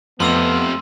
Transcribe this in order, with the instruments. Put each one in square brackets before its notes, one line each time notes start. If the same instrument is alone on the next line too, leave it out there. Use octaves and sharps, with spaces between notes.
[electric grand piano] F2 [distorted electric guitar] C3 F3 [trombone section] A3 B3 [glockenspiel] C6 E6 D#7